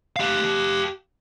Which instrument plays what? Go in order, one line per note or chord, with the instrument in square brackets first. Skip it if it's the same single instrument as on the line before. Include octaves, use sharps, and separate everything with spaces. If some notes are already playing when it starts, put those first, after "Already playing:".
[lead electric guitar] G4 F5